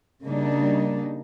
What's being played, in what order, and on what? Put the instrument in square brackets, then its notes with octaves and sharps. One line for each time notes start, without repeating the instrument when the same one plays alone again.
[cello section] C#3 G3 A#3 D4 D#4